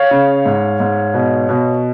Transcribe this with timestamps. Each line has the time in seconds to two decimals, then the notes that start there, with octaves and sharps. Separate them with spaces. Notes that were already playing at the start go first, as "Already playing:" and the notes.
Already playing: C#5 F5
0.11 C#3
0.46 G#2
0.80 G#2
1.14 B2
1.49 B2